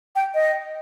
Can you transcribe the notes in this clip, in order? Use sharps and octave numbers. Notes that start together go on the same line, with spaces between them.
G5
D#5